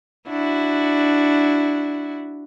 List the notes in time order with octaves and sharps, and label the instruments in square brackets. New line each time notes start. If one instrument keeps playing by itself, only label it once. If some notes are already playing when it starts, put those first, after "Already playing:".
[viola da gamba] D4 E4 F#4